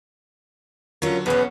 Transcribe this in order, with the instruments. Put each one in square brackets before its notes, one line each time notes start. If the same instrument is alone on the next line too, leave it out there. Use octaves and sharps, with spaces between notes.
[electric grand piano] D3 F#3 [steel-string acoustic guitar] C#4 F4 A#4
[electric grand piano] B1 E2 G#4 [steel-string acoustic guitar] B3 C#4 [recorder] B4